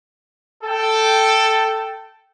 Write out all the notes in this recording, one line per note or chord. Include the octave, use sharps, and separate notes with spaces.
A4 G5